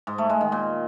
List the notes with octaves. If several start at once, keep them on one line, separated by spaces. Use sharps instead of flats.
G#2
A3
G#3
D#3
A#2